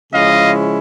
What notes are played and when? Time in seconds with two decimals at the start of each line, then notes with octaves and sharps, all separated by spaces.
0.12 C#3 F3 G#3 C#4 E4 D#5 F5